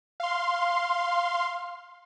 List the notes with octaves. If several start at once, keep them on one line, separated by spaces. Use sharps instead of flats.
F5 C6